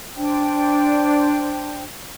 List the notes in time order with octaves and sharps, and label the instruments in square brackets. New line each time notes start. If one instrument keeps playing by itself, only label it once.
[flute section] D4 C5 G5